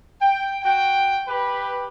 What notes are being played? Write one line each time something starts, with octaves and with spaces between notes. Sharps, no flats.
G5
F#4 G5
G4 B4